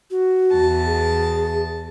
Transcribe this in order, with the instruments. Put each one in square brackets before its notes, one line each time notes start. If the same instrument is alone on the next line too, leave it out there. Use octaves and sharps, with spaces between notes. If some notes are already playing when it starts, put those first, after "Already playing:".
[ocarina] F#4
[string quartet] E2 A5
[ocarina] G#4